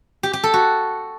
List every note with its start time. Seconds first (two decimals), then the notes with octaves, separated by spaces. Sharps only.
0.23 G4
0.33 G4
0.43 A4
0.54 F#4